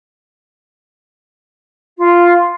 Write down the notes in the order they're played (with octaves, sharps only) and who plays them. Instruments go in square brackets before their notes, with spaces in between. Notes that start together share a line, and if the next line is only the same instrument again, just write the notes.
[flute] F4